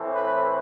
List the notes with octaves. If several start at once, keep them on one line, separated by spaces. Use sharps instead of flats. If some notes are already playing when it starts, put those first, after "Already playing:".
Already playing: A2 E3 A3 C4
B4